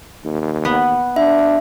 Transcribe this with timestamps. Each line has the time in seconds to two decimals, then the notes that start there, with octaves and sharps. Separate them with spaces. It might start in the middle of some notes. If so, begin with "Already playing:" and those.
0.24 D#2
0.65 B3
1.16 D4 E5